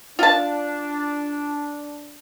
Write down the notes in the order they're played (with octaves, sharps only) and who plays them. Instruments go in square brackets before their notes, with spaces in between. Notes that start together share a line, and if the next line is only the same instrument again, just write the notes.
[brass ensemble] D4 [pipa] F4 A5